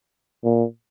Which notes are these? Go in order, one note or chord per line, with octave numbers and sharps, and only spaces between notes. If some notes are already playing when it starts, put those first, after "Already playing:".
A#2